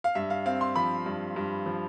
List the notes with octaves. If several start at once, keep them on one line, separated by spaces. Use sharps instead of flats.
F5
G2 E5
F5
C4 F5
C6
F3 B5
G2
G2
F3